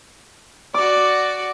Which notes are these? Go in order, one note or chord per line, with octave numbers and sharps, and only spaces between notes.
F#4 D5 D6